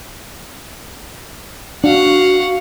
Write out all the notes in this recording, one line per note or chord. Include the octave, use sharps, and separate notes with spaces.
D4 F#4 F5 F#5